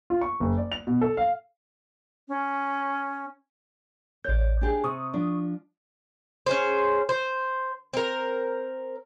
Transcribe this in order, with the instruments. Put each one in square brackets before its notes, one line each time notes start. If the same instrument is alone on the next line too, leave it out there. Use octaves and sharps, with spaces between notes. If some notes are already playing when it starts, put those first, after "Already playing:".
[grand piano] F4
C#6
F#1
D5
F7
B2
A4
F5
[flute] C#4
[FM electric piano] A1 G6 [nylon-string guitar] C#5 D5
[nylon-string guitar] D4 G4 G#4
[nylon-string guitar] C3 [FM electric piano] C#6 D#6
[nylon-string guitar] F3 D4
[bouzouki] C#4 G#4 C5
C5
C4 A#4